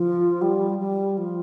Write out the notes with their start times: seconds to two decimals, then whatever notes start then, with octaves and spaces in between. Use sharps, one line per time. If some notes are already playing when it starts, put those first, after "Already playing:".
Already playing: F3
0.41 G3
0.79 G3
1.17 F3